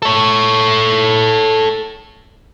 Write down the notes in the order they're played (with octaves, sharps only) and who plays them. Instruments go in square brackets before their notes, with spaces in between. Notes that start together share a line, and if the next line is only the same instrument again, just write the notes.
[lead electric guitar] A4 C#5